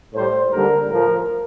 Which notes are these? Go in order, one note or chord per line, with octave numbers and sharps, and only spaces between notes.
A2 G3 C5
D#2 D3 G3 A#4
A2 F3 A#4